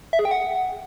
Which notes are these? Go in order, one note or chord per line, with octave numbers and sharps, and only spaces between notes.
E5
G#4
G5
F#5